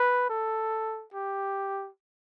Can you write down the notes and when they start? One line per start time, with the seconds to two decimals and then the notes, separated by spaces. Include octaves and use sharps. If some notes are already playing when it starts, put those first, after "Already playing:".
Already playing: B4
0.30 A4
1.14 G4